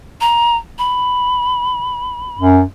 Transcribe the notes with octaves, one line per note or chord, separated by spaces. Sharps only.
A#5
B5
F#2